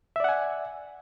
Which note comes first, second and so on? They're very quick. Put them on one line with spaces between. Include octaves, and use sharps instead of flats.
E5 D5 F#5 G#5